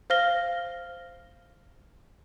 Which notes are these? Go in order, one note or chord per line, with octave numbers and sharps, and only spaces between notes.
C5 F5 F6 A#6 G7